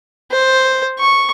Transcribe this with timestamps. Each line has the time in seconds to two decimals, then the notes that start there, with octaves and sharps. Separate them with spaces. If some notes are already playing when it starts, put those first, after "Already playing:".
0.31 C5
1.00 C#6